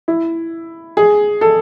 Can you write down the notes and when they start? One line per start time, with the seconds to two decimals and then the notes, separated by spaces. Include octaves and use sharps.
0.08 E4
0.97 G#4
1.41 A4